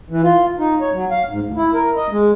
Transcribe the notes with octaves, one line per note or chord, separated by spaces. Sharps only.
E3
F4
D#4
C#5
F#3
F5
G#2
D2
E4
A#4
D#5
G#3